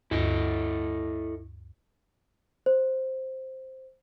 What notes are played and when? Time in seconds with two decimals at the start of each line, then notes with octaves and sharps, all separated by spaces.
0.11 D2 G2 E4 A4 D#5
2.66 C5